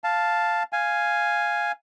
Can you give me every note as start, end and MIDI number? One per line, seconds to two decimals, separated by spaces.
0.04 0.63 77
0.04 0.63 81
0.73 1.72 77
0.73 1.72 80